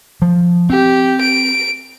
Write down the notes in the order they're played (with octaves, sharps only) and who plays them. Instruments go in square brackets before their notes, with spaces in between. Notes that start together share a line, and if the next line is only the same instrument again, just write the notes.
[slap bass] F3
[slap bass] C4 [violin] G4
[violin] D7